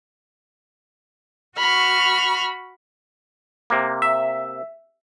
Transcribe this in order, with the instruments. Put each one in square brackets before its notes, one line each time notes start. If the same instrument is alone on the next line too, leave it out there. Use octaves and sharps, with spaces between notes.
[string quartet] F#4 B5 C#6 F6
[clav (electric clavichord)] C3 A#3
[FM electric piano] E5